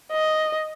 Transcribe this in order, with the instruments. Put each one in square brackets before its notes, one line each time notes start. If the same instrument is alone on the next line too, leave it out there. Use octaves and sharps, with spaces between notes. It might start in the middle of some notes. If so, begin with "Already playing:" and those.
[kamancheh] D#5